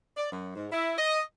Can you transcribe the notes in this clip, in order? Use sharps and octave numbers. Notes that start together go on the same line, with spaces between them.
D5
F#2
G#2
E4
D#5